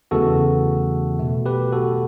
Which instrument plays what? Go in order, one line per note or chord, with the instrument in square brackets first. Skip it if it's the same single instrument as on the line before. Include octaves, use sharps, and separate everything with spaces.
[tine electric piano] E2 C#3 E3 A3 F#4 A4
B2 A3
G4 B4
F#4 A4